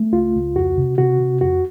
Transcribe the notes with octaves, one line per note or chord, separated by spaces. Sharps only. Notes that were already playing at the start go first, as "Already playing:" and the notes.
Already playing: A3
C#2 F4
C#2
F2 F#4
C3
C3 F#4
C3
F2 F#4